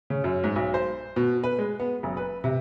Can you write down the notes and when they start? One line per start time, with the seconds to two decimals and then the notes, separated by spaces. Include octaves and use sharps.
0.10 C#3
0.24 F#2
0.44 G#2
0.56 B1
0.74 C5
1.16 B2
1.44 B4
1.58 G#3
1.80 B3
2.03 F#1
2.17 B4
2.44 C3